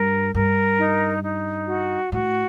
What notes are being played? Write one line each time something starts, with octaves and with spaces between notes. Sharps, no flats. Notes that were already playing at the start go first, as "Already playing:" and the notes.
Already playing: G2 A#4
G2 A#4
D#4
D#4
F#4
A2 F#4